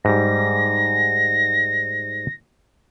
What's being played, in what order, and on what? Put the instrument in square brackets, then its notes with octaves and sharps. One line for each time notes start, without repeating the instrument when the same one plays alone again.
[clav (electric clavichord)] G#2 G3 [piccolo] A#6